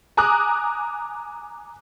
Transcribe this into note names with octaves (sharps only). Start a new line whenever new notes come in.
G#5 A#5 D6 D#6 F#6